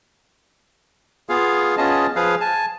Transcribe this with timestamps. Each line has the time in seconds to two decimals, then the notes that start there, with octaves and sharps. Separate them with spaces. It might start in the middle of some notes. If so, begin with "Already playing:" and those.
1.29 B3 F4 G#4 F5
1.78 B3 C#4 F4 G#4 D#5 A5
2.16 F3 G#4 B4 F5
2.41 G#5 A5